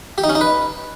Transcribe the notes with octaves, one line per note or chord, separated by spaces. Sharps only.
G4
D#4
C#4
D#4
B4